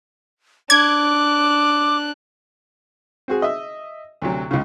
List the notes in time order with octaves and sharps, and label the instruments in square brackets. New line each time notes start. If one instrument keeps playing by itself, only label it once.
[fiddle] D4 F#6 [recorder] D6 [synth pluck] G#6
[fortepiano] C4 F#4 G#4
D#5 E5
D2 C3 F#3
C#2 C#3